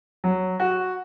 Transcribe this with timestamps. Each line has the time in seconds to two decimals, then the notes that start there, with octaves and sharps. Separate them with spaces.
0.24 F#3
0.60 F#4